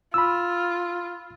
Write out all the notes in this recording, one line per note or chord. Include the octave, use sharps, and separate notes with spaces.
F4 B5 E6